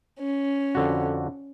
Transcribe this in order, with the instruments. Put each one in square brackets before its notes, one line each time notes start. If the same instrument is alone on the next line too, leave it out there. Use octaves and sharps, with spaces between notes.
[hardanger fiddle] C#4
[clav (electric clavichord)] F2 D3 F#4